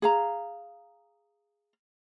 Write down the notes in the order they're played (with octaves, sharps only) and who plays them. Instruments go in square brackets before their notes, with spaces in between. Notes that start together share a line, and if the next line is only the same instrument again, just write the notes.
[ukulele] G#4 F5 A#5